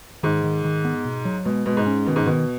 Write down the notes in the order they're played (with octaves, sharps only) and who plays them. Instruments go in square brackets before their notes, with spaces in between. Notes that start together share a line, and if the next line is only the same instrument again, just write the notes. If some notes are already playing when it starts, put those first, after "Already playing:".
[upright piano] G#2 [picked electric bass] D#3
[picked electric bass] D#3
D#3
B3
B2
F#3
[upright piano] B2 [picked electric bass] G#3
[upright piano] B2 [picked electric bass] G#3
[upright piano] G#2
[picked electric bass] C#4
[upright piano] B2 [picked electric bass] D#3
[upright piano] G#2
[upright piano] B2 [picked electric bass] D#3